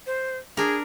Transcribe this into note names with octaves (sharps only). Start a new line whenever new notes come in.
C5
D4 G#4 A#4